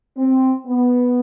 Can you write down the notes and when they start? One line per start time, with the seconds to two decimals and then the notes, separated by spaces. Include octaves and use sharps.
0.17 C4
0.66 B3